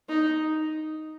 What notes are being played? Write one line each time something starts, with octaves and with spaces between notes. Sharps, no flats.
D#4